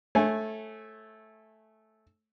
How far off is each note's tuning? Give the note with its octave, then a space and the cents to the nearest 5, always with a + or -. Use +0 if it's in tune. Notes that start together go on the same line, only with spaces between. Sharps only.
A3 -10 C#5 -35 G#5 +0